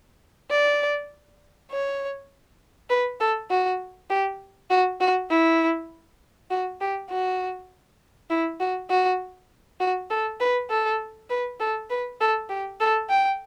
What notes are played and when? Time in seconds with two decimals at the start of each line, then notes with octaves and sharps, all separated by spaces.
0.50 D5
1.71 C#5
2.90 B4
3.20 A4
3.50 F#4
4.10 G4
4.70 F#4
5.01 F#4
5.30 E4
6.50 F#4
6.80 G4
7.10 F#4
8.30 E4
8.60 F#4
8.90 F#4
9.80 F#4
10.10 A4
10.40 B4
10.70 A4
11.30 B4
11.60 A4
11.90 B4
12.20 A4
12.49 G4
12.80 A4
13.09 G5